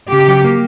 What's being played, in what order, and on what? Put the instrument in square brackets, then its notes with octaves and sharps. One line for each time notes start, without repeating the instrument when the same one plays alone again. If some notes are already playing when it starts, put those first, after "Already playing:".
[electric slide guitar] C#3 [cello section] G4
[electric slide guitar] F#3
A#3